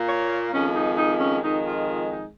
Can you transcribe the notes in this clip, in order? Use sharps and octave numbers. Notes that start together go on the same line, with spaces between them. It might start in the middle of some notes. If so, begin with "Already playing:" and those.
Already playing: A#2 A#3
C#5
F2 D#3 G#3 C#4
D#4
D#4
C#4
F2 D#3 G#3 D#4
F4
F4
D#4